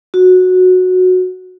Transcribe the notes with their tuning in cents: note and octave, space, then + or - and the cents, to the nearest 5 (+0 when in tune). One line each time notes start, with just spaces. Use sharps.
F#4 -10